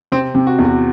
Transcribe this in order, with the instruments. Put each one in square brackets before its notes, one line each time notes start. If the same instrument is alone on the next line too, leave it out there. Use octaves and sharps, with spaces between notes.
[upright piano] C3 [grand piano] C4
[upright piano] C3
[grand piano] F#4
[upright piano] E2
[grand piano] F#4